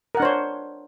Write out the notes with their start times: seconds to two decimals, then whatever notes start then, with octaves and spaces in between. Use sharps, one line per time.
0.15 A#4
0.17 F#5
0.20 D4
0.22 C5
0.25 C#5